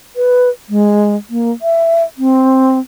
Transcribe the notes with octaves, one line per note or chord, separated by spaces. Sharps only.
B4
G#3
A#3
E5
C4